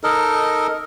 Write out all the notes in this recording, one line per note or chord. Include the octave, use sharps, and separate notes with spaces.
D#4 A4 A#4 D#5